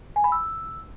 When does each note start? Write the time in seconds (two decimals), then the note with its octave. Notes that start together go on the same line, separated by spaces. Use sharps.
0.16 G#5
0.24 B5
0.32 E6